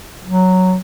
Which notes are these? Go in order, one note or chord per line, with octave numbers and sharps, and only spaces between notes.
F#3